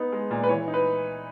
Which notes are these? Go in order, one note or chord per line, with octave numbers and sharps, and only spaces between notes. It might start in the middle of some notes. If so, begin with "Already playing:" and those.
Already playing: B3 D#4
G#3
A#2
B4
E3 C#5
D#4
B4